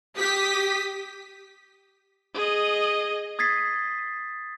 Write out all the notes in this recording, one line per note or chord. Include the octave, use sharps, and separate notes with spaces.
G4 D#6 B6
G#4 D#5
D#6 G#6 A6 B6 C7